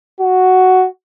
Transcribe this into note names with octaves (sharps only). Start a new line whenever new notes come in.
F#4